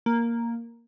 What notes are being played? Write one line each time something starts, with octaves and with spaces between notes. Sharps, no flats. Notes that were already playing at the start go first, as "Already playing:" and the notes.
A#3